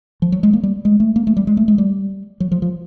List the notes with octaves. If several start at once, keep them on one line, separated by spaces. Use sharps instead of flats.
F3
F#3
G#3
A#3
G3
G#3
A3
A#3
A3
G3
G#3
A3
G#3
G3
F#3
F3
F3